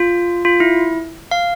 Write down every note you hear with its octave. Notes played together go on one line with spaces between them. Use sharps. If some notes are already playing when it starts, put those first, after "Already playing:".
Already playing: F4
F4
E4
F5